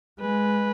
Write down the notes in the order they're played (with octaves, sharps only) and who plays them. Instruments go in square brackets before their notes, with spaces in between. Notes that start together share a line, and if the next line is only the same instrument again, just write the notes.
[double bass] G#3 [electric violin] B4